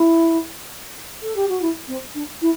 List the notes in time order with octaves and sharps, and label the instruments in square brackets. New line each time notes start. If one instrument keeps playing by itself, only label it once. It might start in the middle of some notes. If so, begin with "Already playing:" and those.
Already playing: [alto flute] E4
A4
G4
F#4
E4
C4
D4
E4